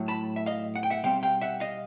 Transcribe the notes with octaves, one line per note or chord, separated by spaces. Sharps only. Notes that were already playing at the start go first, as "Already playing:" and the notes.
Already playing: A2 F#3 A3
A5 B5
E5
D#5 F5
F#5
G5
E5 F#5
B2 G3 C4 F5 G5
F5 G5
E5 F#5
D#5 F5